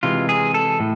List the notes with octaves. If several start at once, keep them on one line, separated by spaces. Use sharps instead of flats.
C3 E3 G#3 F4
G#4
A4
A2